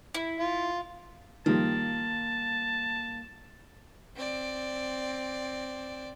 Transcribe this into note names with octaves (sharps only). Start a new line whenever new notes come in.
E4
F4
D#3 F3 G3 A#3 A5
C4 D5